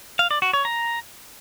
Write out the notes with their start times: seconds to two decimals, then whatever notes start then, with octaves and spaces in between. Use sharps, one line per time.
0.19 F5
0.31 D5
0.42 F#4
0.53 C#5
0.65 A#5